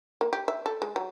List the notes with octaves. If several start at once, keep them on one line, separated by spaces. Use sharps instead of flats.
A#3
G4
E5
A4
G#3
F#3